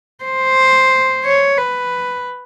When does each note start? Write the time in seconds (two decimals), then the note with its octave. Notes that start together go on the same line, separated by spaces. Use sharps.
0.24 C5
1.25 C#5
1.58 B4